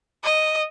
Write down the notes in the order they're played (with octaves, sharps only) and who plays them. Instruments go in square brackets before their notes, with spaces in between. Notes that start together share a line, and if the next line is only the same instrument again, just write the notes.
[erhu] D#5